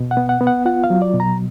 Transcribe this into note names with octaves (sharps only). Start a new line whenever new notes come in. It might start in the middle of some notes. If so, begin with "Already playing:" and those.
Already playing: B2
F#5
B3
F#5
B3
F#5
F4 F#5
F5
F#3
D5
B2
A#5